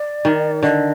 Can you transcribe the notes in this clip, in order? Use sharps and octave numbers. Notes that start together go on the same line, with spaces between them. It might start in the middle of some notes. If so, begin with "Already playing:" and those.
Already playing: D5
D#3
D3 D#5